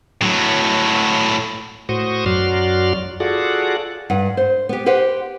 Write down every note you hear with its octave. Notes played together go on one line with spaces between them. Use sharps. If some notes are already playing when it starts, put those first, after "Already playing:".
A2 F#3
A2 F#4 C5 C#6 D#6
F#2 F#3 F#4 D5 C6 F6
F4 F#4 G#4 A4 D5 F#5
G2 F#5
C5
B3 G4
G4 B4 C5 F#5